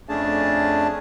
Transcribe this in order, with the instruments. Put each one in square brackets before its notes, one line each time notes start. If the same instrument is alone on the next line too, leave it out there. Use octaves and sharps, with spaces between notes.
[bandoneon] F2 A3 C#4 D4 G#4 A5